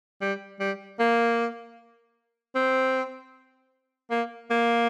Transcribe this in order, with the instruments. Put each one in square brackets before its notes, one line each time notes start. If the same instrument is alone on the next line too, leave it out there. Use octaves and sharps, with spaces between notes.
[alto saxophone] G3
G3
A#3
C4
A#3
A#3